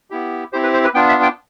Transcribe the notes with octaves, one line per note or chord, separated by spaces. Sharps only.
B3 E4 G4
C4 E4 G4 C5
B4
C5
B4
B3 D4 F4 G5
E5
G5